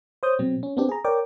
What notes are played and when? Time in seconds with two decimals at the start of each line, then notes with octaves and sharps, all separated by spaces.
0.23 C5 C#5 D#6 G6
0.39 B2 F#3 C4
0.63 C#4
0.77 B3 C4 D4 G4
0.89 G#4 A#5
1.04 A#4 C#5 D5 G5 D6